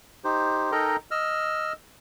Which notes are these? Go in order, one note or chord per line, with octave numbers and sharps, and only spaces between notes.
D#4 G4 C5
D#4 A4 A#4 D#5 G5 A#5
D#5 E6 F6